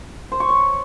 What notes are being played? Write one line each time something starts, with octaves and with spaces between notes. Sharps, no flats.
C5
C#6
C#5